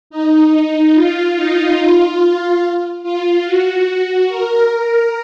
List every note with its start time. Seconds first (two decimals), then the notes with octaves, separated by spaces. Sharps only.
0.10 D#4
0.95 F4
1.36 D#4
1.78 F4
3.03 F4
3.45 F#4
4.29 A#4